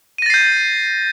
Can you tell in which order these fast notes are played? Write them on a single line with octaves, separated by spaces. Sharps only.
D#7 A#6 A6 C7 G6